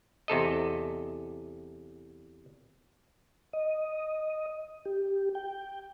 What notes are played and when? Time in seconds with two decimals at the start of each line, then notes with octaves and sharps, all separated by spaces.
0.28 E2 C3 A4 D#5
3.53 D#5
4.85 G4
5.35 G5